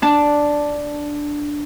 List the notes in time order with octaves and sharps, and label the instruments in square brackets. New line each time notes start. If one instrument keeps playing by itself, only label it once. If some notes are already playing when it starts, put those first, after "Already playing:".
[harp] D4 A5